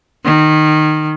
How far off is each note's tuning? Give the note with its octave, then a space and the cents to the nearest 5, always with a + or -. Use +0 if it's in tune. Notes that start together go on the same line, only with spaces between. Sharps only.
D#3 -15